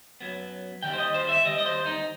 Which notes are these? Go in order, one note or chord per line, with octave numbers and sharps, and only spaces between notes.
F#2 F#3 B3
D#2 D#3 G3 G5
C5
D#5
C5
E5
D#2 D#3 G3 D#5
D#5
C5
D#4